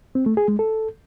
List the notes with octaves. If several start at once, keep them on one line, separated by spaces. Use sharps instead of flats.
C4
A3
G#4
G#3
A4